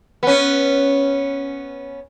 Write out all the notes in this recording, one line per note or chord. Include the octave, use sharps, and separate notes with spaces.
B3 C#4